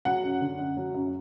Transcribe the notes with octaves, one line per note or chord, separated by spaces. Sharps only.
F#3 F#5
F#2
D3
F#2
F#3
F#2